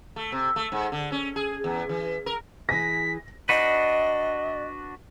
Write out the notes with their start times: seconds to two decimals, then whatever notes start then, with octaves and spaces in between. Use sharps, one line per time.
0.16 A3
0.32 C3
0.56 A3
0.72 G#2
0.92 D3
1.12 C#4
1.36 G#4
1.64 E2
1.89 E3
2.26 A#4
2.69 E3 G#4 A#6 B6
3.49 D4 F#4 B4 D#5